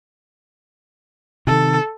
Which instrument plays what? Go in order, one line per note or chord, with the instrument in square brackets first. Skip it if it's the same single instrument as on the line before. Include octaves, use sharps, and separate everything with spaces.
[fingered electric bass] C3 D#3 [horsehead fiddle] A4